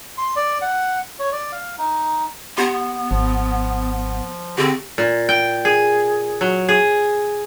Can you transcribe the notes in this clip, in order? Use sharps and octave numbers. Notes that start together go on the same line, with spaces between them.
C6
D5
F#5
C#5
D5
F5
D#4
B3 G4 C6
G#1 F3
D3 C4 G4 G#4
A#2
G5
G#4
F#3
G#4